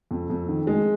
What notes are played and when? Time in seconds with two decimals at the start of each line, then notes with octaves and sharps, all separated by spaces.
0.11 F2
0.30 F2
0.48 D#3
0.67 G#3